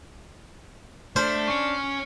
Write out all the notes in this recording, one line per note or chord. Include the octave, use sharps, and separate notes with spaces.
A3 D4 C5 F6
C#4 C#6 C#7